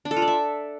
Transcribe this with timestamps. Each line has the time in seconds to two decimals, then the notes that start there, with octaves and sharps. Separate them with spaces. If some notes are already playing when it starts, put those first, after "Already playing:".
0.05 D4
0.11 A4
0.16 F4
0.22 D5
0.28 E5